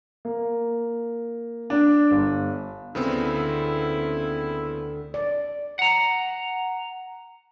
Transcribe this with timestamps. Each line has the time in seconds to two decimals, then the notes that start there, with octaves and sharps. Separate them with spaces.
0.25 A#3
1.70 D4
2.11 G1
2.95 D2 C#3 B3 C4 E4
5.14 D5
5.79 F#5 A#5